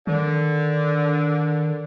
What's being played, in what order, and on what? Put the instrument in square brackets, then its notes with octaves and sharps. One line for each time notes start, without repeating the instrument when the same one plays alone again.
[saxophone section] D3 [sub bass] D#3